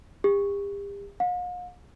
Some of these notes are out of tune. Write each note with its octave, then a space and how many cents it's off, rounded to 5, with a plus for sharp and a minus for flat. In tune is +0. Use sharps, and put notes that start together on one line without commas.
G4 +40
F5 +45